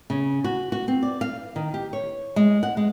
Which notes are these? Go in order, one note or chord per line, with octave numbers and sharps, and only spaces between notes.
C#3
F#4
F#4
C4
D5
F5
D#3
G4
C#5
G#3
F#5
G#3